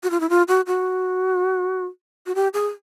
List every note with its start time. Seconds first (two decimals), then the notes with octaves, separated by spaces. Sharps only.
0.03 F#4
0.11 F4
0.20 E4
0.30 F4
0.48 F#4
0.67 F#4
2.26 F#4
2.35 G4
2.54 G#4